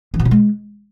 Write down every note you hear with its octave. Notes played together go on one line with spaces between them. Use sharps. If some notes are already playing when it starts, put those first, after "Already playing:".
E3
B2
F4
G#3